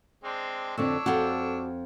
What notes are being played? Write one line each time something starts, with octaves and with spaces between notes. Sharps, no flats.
G#3 C4 D4
F2 D3 C4 D4 C#5 E6
F2 F4 F#4